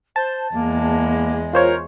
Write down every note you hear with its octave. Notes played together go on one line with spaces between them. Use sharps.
C5 A5
E2 G#3 A#3
F4 A#4 C5 C#5